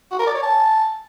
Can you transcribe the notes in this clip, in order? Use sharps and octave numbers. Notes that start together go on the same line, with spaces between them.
F#4
A#4
D5
C#5
A5